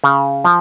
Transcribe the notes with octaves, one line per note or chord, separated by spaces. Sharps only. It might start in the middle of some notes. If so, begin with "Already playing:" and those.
C#3
F3